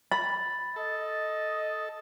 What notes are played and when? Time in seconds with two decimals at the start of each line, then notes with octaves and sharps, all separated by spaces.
0.11 B5 A6
0.76 A4 D#5